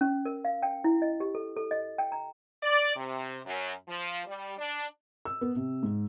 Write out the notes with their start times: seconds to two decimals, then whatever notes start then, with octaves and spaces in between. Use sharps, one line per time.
0.01 C#4
0.25 A#4
0.45 F5
0.63 G5
0.84 E4
1.02 D#5
1.20 G4
1.35 A4
1.57 A4
1.71 D#5
1.98 G5
2.12 A#5
2.63 D5
2.96 C3
3.46 F#2
3.88 F3
4.27 G3
4.58 D4
5.25 E6
5.41 B3
5.56 C3
5.83 G#2